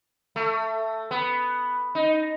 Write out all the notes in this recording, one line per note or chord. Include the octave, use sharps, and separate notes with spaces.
A3
B3
D#4